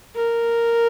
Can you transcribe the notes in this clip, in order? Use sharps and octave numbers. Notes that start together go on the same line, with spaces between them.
A#4